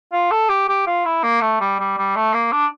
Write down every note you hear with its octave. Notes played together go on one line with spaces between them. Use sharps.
F4
A4
G4
G4
F4
E4
A#3
A3
G3
G3
G3
A3
A#3
D4